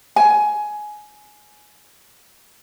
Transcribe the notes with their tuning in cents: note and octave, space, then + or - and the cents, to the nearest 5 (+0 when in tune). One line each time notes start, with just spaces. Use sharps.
G#5 +15